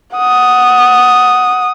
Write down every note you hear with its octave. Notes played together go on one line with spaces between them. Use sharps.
F#5 D#6